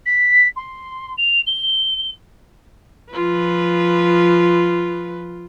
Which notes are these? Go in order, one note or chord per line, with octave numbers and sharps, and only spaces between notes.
B6
C6
F7
G7
F3 F4 B4